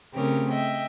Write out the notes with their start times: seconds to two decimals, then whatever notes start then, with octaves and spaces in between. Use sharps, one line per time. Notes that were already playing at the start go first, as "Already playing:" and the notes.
0.13 C#3 A3 C4 C#4 G4 A#4
0.52 D#5 E5 G5